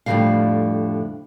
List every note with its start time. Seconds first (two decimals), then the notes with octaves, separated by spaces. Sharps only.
0.06 F2 A2 D3 F#3 G3 F5